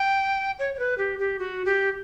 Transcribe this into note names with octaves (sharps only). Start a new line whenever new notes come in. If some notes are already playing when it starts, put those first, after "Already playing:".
Already playing: G5
C#5
C#5
B4
G4
G4
F#4
G4